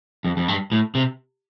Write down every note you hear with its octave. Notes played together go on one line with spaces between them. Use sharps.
F2
F2
G2
A2
C3